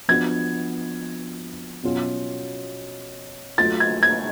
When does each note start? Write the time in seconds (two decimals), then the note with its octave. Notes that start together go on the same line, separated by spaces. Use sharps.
0.08 F3 B3 D4 F#4 G#6
1.83 B2 F#3 C#4 F4
3.58 F#3 A3 F4 A6
3.80 G#6
4.03 G#6